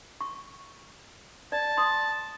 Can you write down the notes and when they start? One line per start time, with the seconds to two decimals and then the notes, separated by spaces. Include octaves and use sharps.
0.21 C#6
1.52 D5 A5
1.77 C6 D#6